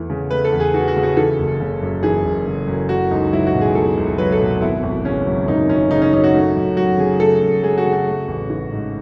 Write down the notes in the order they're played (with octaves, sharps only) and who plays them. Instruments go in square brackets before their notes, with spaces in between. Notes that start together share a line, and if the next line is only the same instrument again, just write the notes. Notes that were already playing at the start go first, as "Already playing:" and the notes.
Already playing: [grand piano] E2 E3 A3
C#3
A3 B4
A4
E2
G#4
E3 F#4
F#4
C#3
F#4
E3 A4
F#1
C#3
F#2
E3 G#4
F#1
C#3
F#2
A3 F#4
C#2 D#4
F#3 E4
F#4
B2
G#4
A3 A4
C#2
F#3 B4
A4
B2
G#1 E4
G#1
C#3 C#4
F#2
G#1 D#4
G#1 C#4
C#3 D#4
C#4
F#2 D#4
F#4
A3
F#2
F#3 F#4
C#3 G#4
A3 A4
F#2
F#3 G#4
F#4
C#3
F#4
A3
A1
E3
G#2